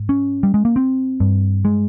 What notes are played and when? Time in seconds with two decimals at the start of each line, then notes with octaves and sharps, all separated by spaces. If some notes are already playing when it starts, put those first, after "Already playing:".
Already playing: G#2
0.09 C#4
0.43 G3
0.54 G#3
0.65 A#3
0.76 C4
1.20 G2
1.65 G#3